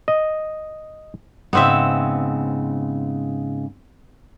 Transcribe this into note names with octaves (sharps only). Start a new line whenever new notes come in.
D#5
G#2 C#3 B3 C4 E5